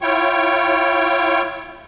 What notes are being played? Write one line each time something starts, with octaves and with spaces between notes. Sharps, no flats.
E4 F4 C#5 G5 C#6